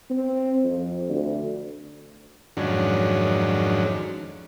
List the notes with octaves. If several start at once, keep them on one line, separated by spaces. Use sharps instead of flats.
C4
F2
D2
F2 G#2 D#3 F#3 C#4 D4